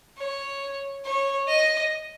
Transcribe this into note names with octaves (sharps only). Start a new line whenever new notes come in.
C#5
C#5
D#5